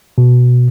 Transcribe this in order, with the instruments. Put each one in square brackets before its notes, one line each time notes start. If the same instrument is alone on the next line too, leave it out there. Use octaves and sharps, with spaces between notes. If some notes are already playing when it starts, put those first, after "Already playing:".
[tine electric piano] B2